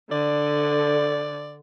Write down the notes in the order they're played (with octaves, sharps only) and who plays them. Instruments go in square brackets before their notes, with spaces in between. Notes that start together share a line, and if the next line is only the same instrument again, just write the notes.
[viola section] D3 [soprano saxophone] D5